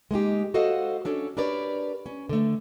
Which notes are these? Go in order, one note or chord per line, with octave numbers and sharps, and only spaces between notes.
G#3 A#3 D#4 G4
F#4 A4 C5 D#5 F5 F#5
C#4 D4 A4 C#5
D4 G4 A#4 B4 C#5 D5
C#4
D3 A3